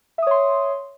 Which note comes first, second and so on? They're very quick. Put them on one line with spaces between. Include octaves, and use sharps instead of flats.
E5 D#6 C#5 C6